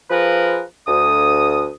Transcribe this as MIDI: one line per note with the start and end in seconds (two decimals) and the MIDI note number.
0.11 0.61 53
0.11 0.61 65
0.11 0.61 68
0.11 0.61 70
0.11 0.61 71
0.87 1.70 38
0.87 1.70 87